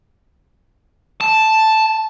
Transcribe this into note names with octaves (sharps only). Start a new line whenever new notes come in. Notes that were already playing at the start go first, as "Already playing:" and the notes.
A5